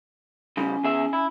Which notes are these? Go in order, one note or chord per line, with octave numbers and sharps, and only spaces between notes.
C#3 G3 C#4
E2 G#4 E5
E4